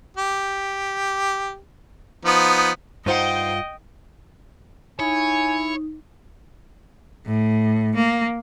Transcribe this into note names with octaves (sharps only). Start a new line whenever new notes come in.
G4
F3 B3 D#4
G2 D#4 F4 C5 D#5 F#5 G5
D#4 E4 C#5 G#5
A2
A#3